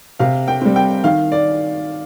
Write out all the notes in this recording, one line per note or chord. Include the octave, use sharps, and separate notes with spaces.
C3 F5
G5
G3 C4
G5
D#3 F5
D5